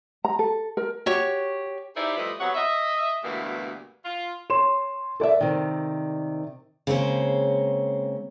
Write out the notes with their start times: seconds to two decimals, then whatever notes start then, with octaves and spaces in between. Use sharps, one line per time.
0.25 A#5
0.39 A4
0.77 A#4
1.06 F#4 G4 C#5 C#6
1.96 D#4 E4 G4 G#4 C5 D5
2.17 F3 G3 A3 E4 B4 D#5
2.39 C3 F#3 B3 C#5 F#5
2.55 D#5 E5
3.23 D2 G2 B2 E3 A#3 B3
4.05 F4
4.50 C#5 C6 E7
5.20 A4 A#4 D5 E5
5.41 C3 D#3
6.87 C#3 G#3 A#3 C4 C#4 C5